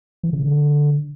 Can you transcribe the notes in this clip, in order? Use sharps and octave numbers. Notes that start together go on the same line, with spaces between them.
E3
C#3
D3